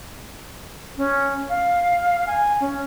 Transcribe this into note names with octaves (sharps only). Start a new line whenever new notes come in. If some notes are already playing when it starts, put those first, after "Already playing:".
C#4
F5
G#5
C#4